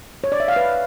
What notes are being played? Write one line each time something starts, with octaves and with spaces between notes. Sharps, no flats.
C#5
D5
E5
F5
B4